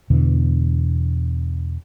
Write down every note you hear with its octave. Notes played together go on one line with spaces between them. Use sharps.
E2 B2 D3 E3